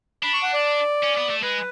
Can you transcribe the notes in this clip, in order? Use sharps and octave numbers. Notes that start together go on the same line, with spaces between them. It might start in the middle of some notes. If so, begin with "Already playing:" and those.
D4 B5
C#6
F#5
D5
C#4
B3
A3
G#3 B4